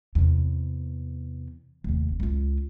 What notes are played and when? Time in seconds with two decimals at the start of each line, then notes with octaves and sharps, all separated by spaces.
0.15 E2 C3
1.84 F1 D#2
2.20 C#2 F4